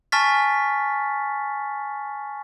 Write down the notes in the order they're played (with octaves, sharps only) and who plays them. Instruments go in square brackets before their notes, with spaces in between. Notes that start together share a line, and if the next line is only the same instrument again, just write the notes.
[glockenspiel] G#5 A5 C#6 F6 A6 B6